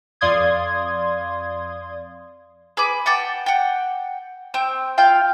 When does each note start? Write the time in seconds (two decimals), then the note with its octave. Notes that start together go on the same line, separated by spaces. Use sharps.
0.21 F2 D5 F5 C6 D#6 G#6
2.77 G#4 B4 D6
3.06 F#5 G5 A5 D6
3.46 F#5 G5
4.54 C4 G5
4.98 F4 F5 G5